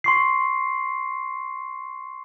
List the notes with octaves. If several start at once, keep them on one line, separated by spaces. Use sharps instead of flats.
C6 C#6 C7